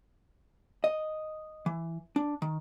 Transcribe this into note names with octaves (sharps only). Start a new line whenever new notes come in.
D#5
E3
D4
D#3